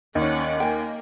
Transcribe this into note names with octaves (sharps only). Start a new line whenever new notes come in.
D#2 C#4 D5 D#5 F#5
A#3 G5 G#5